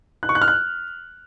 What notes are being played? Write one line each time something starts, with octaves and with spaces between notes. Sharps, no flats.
F#6
C#6
F#6
F6
F#6